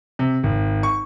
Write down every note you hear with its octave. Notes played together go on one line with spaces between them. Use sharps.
C3
G#1
C#6